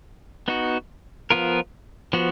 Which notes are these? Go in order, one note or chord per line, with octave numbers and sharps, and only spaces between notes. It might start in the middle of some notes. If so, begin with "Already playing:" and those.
B3 D#4 F#4
F3 B3 F4 A#4
F3 B3 F#4